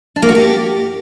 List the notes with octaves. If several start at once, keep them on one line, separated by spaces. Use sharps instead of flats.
D4
A#3
F#4
G4